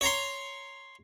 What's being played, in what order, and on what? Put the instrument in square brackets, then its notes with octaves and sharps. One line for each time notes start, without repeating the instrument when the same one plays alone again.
[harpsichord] C#5 A#5 C6